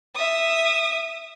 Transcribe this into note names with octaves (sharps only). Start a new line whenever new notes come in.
E5 D#6